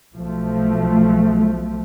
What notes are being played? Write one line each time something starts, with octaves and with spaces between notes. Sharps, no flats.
B1 F3 A3